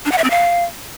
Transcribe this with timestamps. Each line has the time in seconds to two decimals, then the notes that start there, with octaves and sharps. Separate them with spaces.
0.05 D4
0.12 F#5
0.18 E5
0.24 C4
0.30 F5